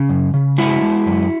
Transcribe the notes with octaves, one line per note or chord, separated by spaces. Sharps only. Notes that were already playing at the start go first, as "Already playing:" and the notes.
Already playing: C#3
F#2
C#3
G#3 E4 F#4
G#3
F#2